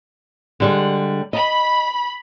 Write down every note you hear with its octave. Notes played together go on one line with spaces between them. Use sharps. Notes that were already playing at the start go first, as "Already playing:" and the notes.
D3 G3 G#3
D#5 B5